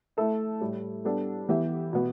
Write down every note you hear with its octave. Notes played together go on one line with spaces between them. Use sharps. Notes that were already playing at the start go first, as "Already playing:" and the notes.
A3 E4 A4 E5
A2 G3 E4
G3 B3 D4 A4
E3 B3 G4 E5
B2 B3